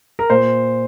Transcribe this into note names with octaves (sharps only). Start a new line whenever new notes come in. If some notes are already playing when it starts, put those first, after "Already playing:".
A#4
A#2 C5